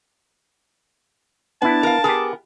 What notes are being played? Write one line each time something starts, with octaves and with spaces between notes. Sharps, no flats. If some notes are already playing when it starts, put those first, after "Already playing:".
B3 D4 E4 A5
A#4 F5
B3 G4 G#4 A#4